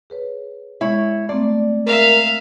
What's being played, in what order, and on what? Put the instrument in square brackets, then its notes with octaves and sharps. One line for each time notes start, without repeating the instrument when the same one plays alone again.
[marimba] G#4 B4 C#5
[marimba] G#3 B3 [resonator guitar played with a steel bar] E4 C#5
[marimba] A3 A#3 C4 [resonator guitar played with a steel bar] D5
[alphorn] A#4 [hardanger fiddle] E5 F5 [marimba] A6